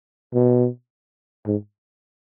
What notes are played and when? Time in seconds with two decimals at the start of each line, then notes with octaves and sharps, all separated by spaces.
0.34 B2
1.47 G#2